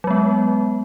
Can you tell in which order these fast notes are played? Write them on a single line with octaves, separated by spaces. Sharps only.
F#3 G#3 B3